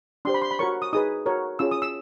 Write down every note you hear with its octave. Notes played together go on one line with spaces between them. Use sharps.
D4 G4 C5 C6
B5
C6
B5
F#4 A#4 C#5 C#6
D#6
D#4 G#4 B4 D#6
F#4 A#4 C#5
C#4 F4 G#4 E6
D#6
E6